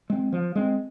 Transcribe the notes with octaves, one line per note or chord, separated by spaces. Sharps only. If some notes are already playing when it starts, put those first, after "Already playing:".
G#3 C4
F3
G#3 C4